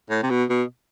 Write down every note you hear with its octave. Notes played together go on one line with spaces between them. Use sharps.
A2
C3
B2
B2